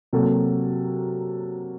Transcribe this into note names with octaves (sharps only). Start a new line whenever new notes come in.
C3 F#3 A#3 F#4 A4